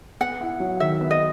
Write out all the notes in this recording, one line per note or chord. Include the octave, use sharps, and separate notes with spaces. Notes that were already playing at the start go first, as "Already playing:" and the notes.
B3 F#5
E4
F#3
D#3 E5
B3
D#5